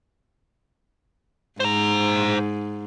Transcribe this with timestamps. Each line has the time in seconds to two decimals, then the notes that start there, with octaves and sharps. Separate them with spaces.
1.60 G#2 C5 A#5